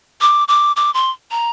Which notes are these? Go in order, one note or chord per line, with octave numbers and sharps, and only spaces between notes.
D6
D6
D6
C6
A#5